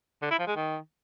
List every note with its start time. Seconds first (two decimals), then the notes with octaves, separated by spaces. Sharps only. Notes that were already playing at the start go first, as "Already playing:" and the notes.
0.22 D3
0.31 E4
0.39 F3
0.47 G#3
0.56 D#3